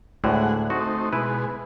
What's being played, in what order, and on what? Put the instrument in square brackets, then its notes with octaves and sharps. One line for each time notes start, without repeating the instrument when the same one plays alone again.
[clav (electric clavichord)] D2 A2 D3 [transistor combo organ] G#3 F#5
[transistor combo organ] A3 C4 D#4 [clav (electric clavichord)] F#4
[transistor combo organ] B2 G#3 [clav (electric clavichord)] E4 B4